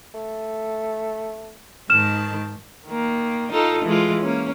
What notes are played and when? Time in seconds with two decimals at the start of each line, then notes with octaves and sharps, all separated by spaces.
0.14 A3
1.90 G#2 D#3 A5 F6 E7
2.87 D#3 A#3
3.52 D#4 F4 A4
3.85 E3 G#3 F4
4.22 A#3 C#4